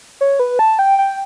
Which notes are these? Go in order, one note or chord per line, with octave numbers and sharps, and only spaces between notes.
C#5
B4
A5
G5
G5